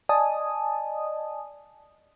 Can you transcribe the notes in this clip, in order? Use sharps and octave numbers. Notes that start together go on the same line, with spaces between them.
D5 D#5 G#5 A5 D#6